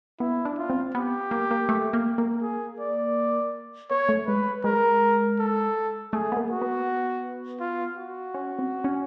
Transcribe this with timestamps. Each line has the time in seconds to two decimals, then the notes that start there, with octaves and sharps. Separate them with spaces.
0.20 B3 E4
0.45 D4
0.58 F4
0.70 C4
0.95 B3 G4
1.31 A#3
1.51 A#3
1.69 A3
1.93 A#3
2.18 A#3
2.42 G#4
2.80 D5
3.90 B3 C#5
4.09 A3
4.27 G#3 B4
4.64 G#3 A#4
5.39 A4
6.13 A3 G#4
6.32 B3
6.37 A#3
6.50 F#4
6.62 B3
7.60 F4
7.97 F#4
8.34 C#4
8.59 C4
8.84 C#4